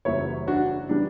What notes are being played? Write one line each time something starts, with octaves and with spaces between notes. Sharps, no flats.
F#1 F#2 E3 G3 C#5 E5
D4 F#4
E3 G3 D4